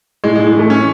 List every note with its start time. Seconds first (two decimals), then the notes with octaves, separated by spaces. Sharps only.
0.24 A2 G#3
0.35 G#3
0.39 A2
0.47 G#3
0.55 E3 A3
0.70 E3 C#4